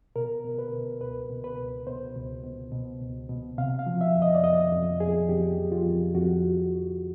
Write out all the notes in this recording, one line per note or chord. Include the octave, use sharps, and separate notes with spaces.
B2 A#4
B2
B4
B2
C#2 B4
B2
B4
C#2
B2 C5
C#2
B2
B2
C#2
B2
C3 F5
F5
F3
E5
F2
D#5
D5
F2 D#5
F2
F2 G#4
F2 G4
F3
F4
F2
F2 F#4